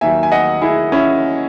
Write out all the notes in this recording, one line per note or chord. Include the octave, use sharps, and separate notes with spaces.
D#2 D#3 F#3 E5 G#5
G#5
D#5 F#5
E4 G#4
C#4 E4